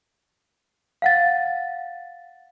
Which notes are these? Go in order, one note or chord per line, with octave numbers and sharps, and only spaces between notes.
F5 F#5 A6